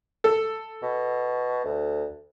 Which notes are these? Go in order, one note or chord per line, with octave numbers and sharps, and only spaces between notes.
A4
B2
D2